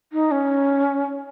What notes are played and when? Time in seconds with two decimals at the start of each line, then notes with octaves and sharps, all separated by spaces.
0.13 D#4
0.31 C#4